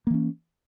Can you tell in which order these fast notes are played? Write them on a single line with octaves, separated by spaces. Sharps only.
A#3 E3 C#4